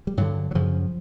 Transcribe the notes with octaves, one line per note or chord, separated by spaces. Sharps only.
G3
G2 D3 F#3
F#3
F#2 C#3 F3